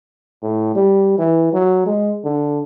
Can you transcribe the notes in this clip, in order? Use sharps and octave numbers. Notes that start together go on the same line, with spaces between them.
A2
G3
E3
F#3
G#3
D3